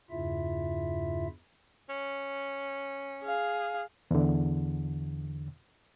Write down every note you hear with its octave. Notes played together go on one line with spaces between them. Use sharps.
E2 G2 C#3 E4 F4 E5
C#4
G#4 F5
E2 D3